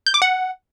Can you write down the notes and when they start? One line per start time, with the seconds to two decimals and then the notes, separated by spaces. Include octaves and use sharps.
0.06 G6
0.14 D6
0.22 F#5